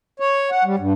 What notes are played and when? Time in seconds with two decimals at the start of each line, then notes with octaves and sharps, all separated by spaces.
0.20 C#5
0.51 F#5
0.65 G3
0.79 G2